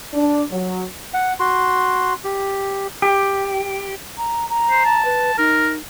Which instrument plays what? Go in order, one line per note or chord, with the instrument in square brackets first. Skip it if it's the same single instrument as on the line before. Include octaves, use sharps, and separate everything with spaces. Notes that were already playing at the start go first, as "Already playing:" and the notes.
[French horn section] D4
F#3
[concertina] F#5
F#4 C6
G4
[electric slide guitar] G4
[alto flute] A#5
A#5
[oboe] C5
A5
[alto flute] B4
[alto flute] D#4 [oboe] A#4